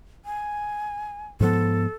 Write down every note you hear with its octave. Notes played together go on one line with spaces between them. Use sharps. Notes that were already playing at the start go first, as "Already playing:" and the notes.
G#5
G#2 F3 B3 A4